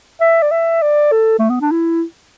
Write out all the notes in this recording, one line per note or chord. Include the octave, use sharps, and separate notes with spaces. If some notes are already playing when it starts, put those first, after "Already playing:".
E5
D5
E5
D5
A4
A3
B3
D4
E4